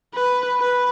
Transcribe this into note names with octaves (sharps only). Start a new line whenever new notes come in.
B4
B4